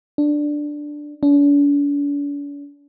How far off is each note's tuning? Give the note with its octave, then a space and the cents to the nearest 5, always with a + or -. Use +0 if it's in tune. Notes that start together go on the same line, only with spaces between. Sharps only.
D4 +5
D4 -45